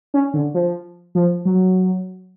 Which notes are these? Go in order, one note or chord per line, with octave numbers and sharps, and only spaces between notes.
C#4
D3
F3
F3
F#3